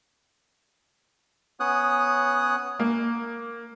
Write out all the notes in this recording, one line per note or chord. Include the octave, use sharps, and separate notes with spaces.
B3 C#4 C#5 D#6 F#6
A#3